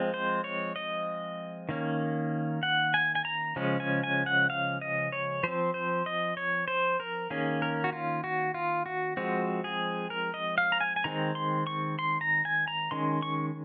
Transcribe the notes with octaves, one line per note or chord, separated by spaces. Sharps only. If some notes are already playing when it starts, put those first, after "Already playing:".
Already playing: F3 G#3 C4
C5
C#5
D#5
D#3 A#3 C#4
F#5
G#5
G#5
A#5
C#3 F3 G#3 C#4
G#5
G#5
F#5
F5
D#5
C#5
F3 C4 C5
C5
D#5
C#5
C5
A#4
D#3 A#3 C#4 G#4
A#4
F#4
F4
F#4
F4
F#4
F3 G#3 C4 F#4
G#4
A#4
D#5
F5
A#5
G#5
G#5
D#3 G#3 C4 A#5
C6
C#6
C6
A#5
G#5
A#5
D#3 G#3 C#4 C6
C#6